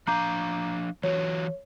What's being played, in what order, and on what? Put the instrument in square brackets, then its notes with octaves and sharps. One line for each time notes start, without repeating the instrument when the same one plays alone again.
[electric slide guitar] F3 D4 F5 [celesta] A#5 D6 G6
[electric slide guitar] E3 F#3 F#4 [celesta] C#5